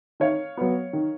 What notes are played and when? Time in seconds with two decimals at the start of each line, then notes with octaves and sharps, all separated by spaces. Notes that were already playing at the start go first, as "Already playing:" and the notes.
0.20 D#3 C#5 F5
0.57 F#3 B3
0.93 D#3